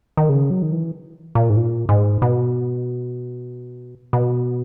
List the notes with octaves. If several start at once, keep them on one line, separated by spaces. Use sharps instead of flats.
D#3
C#3
F#3
D#3
E3
A#2
G#2
A#2
G#2
B2
B2